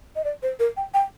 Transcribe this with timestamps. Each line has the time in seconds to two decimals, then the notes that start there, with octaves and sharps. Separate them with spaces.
0.16 D#5
0.24 D5
0.43 C5
0.59 A#4
0.77 G5
0.94 G5